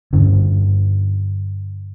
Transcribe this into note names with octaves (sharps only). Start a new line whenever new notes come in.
G2 D3 C#4